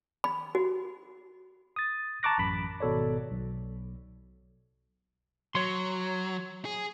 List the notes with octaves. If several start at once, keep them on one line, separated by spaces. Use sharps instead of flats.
B5
F#4
D#6 A6
A5 A#5 C#6 D6 F#6 A#6
A1 F#2 B5
G#1 B2 A4 C#5 D5
B1
F#3 C#5 C6
G#4